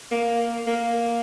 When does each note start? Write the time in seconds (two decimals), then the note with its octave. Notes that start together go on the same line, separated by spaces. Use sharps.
0.11 A#3
0.67 A#3